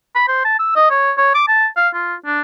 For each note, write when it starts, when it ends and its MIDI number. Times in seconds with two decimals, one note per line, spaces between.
0.15 0.27 83
0.28 0.43 72
0.45 0.59 81
0.59 0.72 88
0.76 0.89 75
0.90 1.12 73
1.17 1.30 73
1.34 1.44 86
1.48 1.67 81
1.77 1.88 77
1.94 2.15 65
2.26 2.41 62